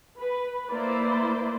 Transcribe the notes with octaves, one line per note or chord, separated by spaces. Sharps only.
B4
A#3 E4 B4 C5 D5